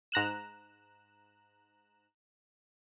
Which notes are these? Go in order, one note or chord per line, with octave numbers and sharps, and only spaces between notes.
G#2 A#5 F#6 E7